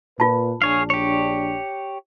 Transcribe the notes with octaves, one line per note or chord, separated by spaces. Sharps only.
A#2 F4 B4 A5
A#1 D4 G#4 C#5 F5
G4 C#5